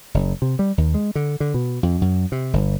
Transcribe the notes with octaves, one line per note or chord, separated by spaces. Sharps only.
F#1
C3
G3
D#2
G#3
D3
D3
B2
F2
F#2
C3
G1